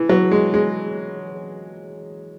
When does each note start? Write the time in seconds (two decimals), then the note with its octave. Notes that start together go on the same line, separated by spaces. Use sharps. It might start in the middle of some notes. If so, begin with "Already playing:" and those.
Already playing: E3
0.09 F#3
0.31 G#3
0.54 G#3